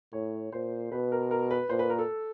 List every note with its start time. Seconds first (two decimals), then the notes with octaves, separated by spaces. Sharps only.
0.13 A2 C#5
0.53 A#2 C5
0.92 B2 B4
1.12 A#4
1.31 A#4
1.51 B4
1.69 A#2 C5
1.79 B4
1.90 A#4
1.99 A4